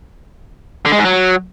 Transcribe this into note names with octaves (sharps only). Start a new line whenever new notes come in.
D3
G#3
G#2
F#3